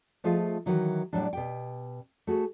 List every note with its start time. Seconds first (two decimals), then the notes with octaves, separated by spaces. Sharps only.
0.24 F3 A3 F4 G#4 D#5 F5
0.66 D#3 E3 F#3 D#4
1.13 A2 F#3 G3 D4
1.33 B2 G4 G5
2.27 A3 F#4 G#4